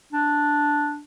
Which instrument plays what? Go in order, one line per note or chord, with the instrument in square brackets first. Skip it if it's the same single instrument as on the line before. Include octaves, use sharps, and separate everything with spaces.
[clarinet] D4